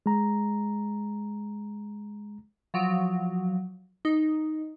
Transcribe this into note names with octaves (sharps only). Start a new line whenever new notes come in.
G#3 A#5
F3 F#3
D#4